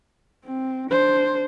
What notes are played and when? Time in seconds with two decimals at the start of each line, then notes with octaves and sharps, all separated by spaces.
0.45 C4
0.91 D4 C5